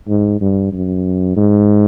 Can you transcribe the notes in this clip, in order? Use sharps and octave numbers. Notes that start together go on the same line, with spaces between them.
G#2
G2
F#2
G#2